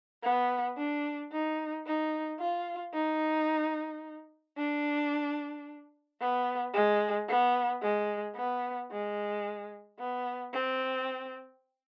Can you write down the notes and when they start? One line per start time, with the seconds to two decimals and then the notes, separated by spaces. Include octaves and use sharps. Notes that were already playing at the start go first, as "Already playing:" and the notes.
0.23 B3
0.78 D4
1.32 D#4
1.86 D#4
2.40 F4
2.94 D#4
4.57 D4
6.20 B3
6.74 G#3
7.28 B3
7.82 G#3
8.36 B3
8.91 G#3
10.00 B3
10.54 C4